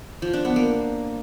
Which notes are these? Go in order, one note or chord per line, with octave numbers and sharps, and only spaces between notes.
F3
D4
B3
A#3